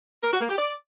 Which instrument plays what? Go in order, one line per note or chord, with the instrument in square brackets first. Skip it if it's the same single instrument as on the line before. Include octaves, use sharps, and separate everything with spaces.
[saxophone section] A#4
F#4
A#3
G4
D5